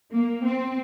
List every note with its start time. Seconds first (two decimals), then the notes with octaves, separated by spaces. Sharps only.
0.11 A#3
0.44 C4